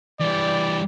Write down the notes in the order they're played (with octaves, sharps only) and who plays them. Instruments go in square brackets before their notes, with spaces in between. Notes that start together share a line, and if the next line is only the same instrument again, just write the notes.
[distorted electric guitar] E3 G3 [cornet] D5